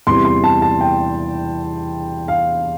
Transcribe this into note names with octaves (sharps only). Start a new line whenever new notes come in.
E2 C3 E3 G3 C6
C6
A5
A5
G5
F5